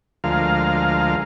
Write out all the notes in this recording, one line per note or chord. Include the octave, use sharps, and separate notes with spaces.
D2 F3 G#3 A#4 F5